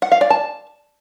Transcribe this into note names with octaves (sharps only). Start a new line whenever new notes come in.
F#5
F5
D5
A5